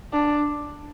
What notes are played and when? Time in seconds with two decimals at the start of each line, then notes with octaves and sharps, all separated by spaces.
0.13 D4